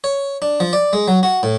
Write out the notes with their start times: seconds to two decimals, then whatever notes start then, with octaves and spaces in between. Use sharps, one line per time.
0.04 C#5
0.42 D4
0.60 F3
0.73 D5
0.93 G#3
1.08 F#3
1.23 F#4
1.43 A2